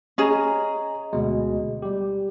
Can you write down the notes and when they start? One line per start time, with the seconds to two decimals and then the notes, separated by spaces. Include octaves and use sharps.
0.18 C#4 G#4 D#5 A#5
1.13 D2 B2 G#3
1.82 G3 G4